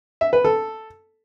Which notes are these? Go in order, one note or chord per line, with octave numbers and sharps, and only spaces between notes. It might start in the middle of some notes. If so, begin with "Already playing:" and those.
E5
B4
A4